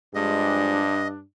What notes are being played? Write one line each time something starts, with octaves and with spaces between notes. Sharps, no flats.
G2 F3 G3 G#3 D4 D#5